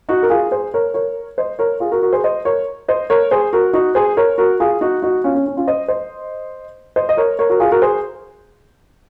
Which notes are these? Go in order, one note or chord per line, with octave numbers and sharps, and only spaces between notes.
D#4 F#4
A#4
F4 G#4
G#4 C5
A#4 C#5
A#4 C#5
C5 D#5
A#4 C#5
F4 G#4
F#4 A#4
F#4 A#4
G#4 C5
C5 D#5
A#4 C#5
C5 D#5
A#4 C#5
G#4 C5
F#4 A#4
D#4 F#4
G#4 C5
A#4 C#5
F#4 A#4
F4 G#4
D#4 F#4
D#4 F#4
C#4 F4
C#4
C#4
C#4 F4
C5 D#5
C5 D#5
C5 D#5
D#5
A#4 C#5
A#4 C#5
F#4 A#4
F4 G#4
F#4 A#4
G#4 C5